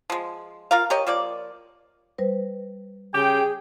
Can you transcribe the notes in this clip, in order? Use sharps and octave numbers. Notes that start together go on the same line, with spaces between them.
F3 G#3
F4 A#4 F5
G4 A#4 C#5 D#5
F3 A#3 D5
G3 B4 C5
C#3 G4 G#4 G5